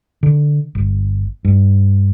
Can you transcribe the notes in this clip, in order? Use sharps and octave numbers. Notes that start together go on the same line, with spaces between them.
D3
G1
G2